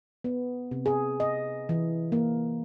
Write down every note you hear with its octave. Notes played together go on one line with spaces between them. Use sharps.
B3
C3
G#4
D#5
E3
A#3